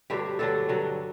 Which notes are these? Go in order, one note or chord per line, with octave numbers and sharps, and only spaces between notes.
G2 D3 F#3 G4
G2 D3 F#3 A4
G2 D3 F#3